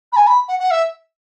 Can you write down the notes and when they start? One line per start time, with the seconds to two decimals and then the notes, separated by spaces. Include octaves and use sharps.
0.12 B5
0.16 G#5
0.26 B5
0.48 F#5
0.59 F#5
0.70 E5